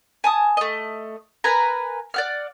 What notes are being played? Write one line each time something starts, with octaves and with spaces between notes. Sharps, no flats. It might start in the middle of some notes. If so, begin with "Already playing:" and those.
G#5 A5 D#6
A3 D#5
A#4 B4 G#5 A#5
D5 F#5 F6